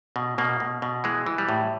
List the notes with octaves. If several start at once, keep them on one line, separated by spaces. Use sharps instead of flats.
B2
B2 A#3
B2
B2
E3 G#3
E3
G3
A2